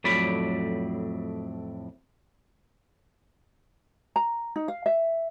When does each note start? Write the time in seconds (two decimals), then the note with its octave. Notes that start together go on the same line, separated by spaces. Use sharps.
0.04 F2 A2 F#3 D5 B5
4.16 A#5
4.56 D#4
4.68 F5
4.86 E5